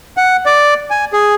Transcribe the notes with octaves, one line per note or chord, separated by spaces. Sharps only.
F#5
D5
G#5
G#4